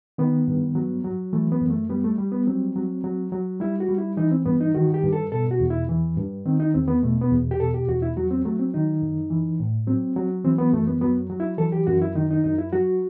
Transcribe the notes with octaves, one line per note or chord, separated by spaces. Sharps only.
D#3 B3
G2
F#3
F#3
E3 A3
B3
F#2
A3
G3 B3
A3
G3
B3
F#3 C4
F#3
F#3
F#3
G3 E4
F#4
G3
E4
E3 D#4
C4
G2 B3
D#4
D#3 F#4
G4
G2
A4
B2 A4
F#4
E2
E4
E3
G2
D#3 C4
D#4
E2 C4
B3
B2 A3
B3
E2
G4
B2 A4
G4
E2 F#4
E4
F#3 F#4
C4
F#3 A3
C4
D#3 D#4
F#2
E3
A2
F#3 C4
F#3
E3 C4
B3
F#2 A3
B3
F#3 B3
F#3
E4
E3 A4
G4
F#2 F#4
E4
D#3 D#4
D#4
F#2 D#4
E4
F#3 F#4